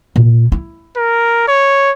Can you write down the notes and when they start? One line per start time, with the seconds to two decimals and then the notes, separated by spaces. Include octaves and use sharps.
0.16 A#2
0.52 E4
0.97 A#4
1.48 C#5